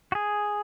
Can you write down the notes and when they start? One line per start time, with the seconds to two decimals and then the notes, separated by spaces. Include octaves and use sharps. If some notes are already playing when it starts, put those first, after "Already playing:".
0.12 F#4
0.15 G#4